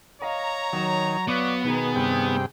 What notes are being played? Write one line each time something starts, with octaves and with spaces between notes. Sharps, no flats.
C#5 D#5 F5 A#5
D#3 F#3 E7
B3 F#4 B4 D5 F5 C#6
B2 D#3 G#4 A#5
G2 C3 G5